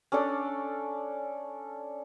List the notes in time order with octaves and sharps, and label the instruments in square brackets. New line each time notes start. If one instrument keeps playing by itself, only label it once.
[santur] C#4 D4 A4 D5